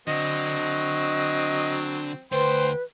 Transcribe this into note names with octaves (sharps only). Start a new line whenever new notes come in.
D3 F#3 C4 D#5
D2 B4 C5 G5 C6